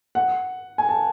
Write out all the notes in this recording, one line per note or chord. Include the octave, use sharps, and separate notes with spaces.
F#5
G#5
A5